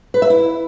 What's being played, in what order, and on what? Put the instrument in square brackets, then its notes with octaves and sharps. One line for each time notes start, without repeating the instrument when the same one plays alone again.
[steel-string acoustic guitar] B4
E5
E4